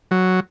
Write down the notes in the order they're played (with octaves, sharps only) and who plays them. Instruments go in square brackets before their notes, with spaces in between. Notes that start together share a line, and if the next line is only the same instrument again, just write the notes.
[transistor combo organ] F#3